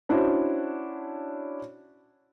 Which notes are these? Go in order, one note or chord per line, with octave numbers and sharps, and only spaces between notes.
C#4 D4 E4 F#4 C5